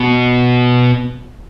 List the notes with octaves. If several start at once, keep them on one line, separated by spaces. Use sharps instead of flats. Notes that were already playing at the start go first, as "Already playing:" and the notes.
Already playing: B2